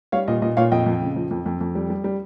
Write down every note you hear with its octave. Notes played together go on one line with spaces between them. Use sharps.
G3 C#5 F5
A#2 D#5
A#2 D#5
A#2 C#5 F5
F2 D#5 G5
F2
C#3
F3
F2
F2
F2
G3
G3
G3